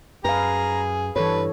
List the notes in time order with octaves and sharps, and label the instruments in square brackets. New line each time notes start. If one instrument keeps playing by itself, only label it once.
[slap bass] F#2 [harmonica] G#4 [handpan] B4 F5 [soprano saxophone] A#5
[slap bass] G2 [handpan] E3 A4 C#5 [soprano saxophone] B4